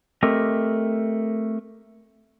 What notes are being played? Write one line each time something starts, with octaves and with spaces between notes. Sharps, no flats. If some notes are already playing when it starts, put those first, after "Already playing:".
A3 C4 G4 A#4 D#5